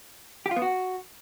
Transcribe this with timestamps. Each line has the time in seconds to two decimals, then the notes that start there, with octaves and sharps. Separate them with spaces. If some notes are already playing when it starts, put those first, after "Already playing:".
0.46 G4
0.51 F4
0.56 B3
0.62 F#4